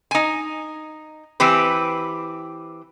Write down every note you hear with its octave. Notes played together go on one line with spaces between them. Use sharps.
D#4 G#5
E3 C4 G4 B4